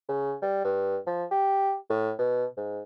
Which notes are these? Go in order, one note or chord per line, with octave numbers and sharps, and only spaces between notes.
C#3
G3
G2
F3
G4
A2
B2
G#2